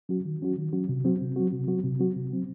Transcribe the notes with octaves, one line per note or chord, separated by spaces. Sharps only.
F#3 C#4 F#4
D#3
F#3 C#4 F#4
D#3
F#3 C#4 F#4
C3
F#3 C4 F#4
C3
F#3 C4 F#4
C3
F#3 C4 F#4
C3
F#3 C4 F#4
C3
F#3 C4